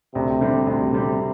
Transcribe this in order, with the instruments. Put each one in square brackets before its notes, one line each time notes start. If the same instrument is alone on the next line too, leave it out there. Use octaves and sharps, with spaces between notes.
[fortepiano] D2 [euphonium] C3
[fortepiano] D3 G3 C4
[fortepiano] D2 [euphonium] C3
[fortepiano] D3 G3 C4